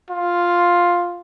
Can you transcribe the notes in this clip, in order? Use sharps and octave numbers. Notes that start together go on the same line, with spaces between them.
F4